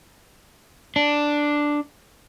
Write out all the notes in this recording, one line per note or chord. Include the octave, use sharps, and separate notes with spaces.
D4